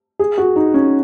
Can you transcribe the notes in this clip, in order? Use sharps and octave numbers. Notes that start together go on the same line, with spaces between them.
G#4
F#4
D#4
C#4